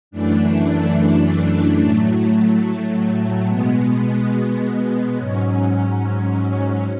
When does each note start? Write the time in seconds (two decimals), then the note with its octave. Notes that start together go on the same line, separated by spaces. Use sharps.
0.11 F#2 E3 A3 D4
1.79 A2 F#3 A3
3.47 B2 G#3 B3
5.15 G#2 F#3 C#4